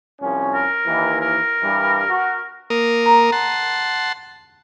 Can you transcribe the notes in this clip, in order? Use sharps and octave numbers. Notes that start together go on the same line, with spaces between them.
C2 F3 C#4
A#4
D#2 D#3 E3
A#4
G2 E3 G3
F#4
A#3 A#4 D#6
A#5
F#5 A5 C6